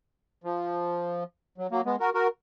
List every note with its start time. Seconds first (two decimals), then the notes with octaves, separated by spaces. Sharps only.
0.44 F3
1.58 F#3
1.71 F#3 A#3
1.86 G#3 B3
2.00 F#4 A#4
2.14 F#4 A#4